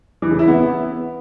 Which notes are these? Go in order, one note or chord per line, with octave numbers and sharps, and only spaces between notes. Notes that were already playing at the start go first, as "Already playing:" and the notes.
E3
C#3
E4
B3